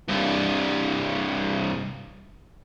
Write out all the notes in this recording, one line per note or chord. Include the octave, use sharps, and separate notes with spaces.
C2 G2